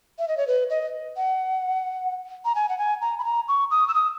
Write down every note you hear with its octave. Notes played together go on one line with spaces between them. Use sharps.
E5
D#5
C#5
B4
D#5
F#5
A#5
G#5
F#5
G#5
A#5
B5
A#5
C#6
D#6
E6
D#6